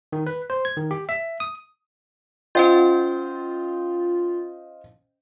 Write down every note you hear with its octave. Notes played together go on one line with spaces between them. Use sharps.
D#3
B4
C5
G#6
D#3
G4
E5
D#6
C#4 F4 C5 D#5 F5 G5 G6